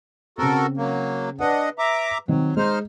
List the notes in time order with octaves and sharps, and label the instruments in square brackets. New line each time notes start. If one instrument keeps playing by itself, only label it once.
[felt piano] C#3 C4 [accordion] F#4 A4 A#4
[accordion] F#3 A#3
[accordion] D4 D#5 F#5 [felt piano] B4
[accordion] E5 A#5 D6
[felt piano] D#3 C4 [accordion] F#3
[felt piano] G#3 [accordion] D#4 C5 F6